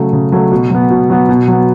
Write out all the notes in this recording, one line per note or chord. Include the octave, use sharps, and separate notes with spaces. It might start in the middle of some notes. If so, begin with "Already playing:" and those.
Already playing: C#3 F#3 A3
C#3
F#3 A3
B2
F#3 B3
B2
F#3 B3
B2
F#3
B3